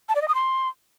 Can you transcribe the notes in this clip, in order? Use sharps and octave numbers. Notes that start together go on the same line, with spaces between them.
A5
D5
D#5
D#6
C6